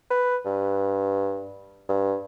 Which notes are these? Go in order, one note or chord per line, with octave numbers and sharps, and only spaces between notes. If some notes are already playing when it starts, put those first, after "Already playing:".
B4
G2
G2